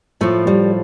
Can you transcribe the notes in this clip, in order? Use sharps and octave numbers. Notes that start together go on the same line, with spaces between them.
A2 F3 A3
G3